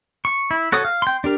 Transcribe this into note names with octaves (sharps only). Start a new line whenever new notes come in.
C#6
E4
F#4 A4 C#5 D#6
F5
G5 C6
D4 G4 A#4